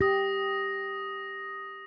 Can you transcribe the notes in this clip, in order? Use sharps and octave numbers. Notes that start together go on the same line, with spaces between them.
G4 D#6 A#6